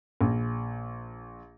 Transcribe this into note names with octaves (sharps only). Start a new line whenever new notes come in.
A#1